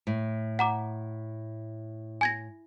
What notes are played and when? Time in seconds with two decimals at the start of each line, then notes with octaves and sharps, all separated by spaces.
0.07 A2
0.59 F#5 A#5 D6
2.21 G#5 G#6 A#6